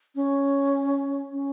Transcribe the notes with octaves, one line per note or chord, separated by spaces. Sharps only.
C#4
C#4